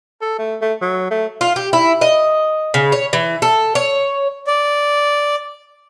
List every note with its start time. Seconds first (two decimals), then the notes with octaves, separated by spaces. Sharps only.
0.21 A4
0.38 A3
0.62 A3
0.81 F#3
1.11 A3
1.41 F4
1.56 G4
1.73 E4
2.01 D#5
2.74 C#3
2.92 C#5
3.13 E3
3.42 A4
3.75 C#5
4.47 D5